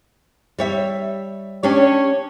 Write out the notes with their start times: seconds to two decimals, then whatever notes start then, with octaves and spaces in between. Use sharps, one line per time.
0.58 G3 C#5 E5
1.63 C#4 D4 G4 C#5